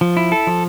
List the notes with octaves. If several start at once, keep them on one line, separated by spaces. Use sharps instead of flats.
F3
E4
A4
F3